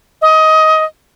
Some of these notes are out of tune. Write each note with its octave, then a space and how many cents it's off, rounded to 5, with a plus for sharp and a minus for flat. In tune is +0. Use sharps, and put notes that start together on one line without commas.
D#5 +20